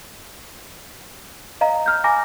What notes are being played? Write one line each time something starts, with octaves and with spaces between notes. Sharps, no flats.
D#5 F5 A#5
F6 G6
G#5 A#5 B5 D6 A#6